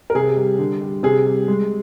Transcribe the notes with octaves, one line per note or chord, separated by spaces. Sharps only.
A#4
C3 G#4
G3
D3
G3
C3 G#4
G3
G#3